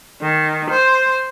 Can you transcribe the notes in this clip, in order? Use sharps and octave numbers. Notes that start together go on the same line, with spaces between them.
D#3
C5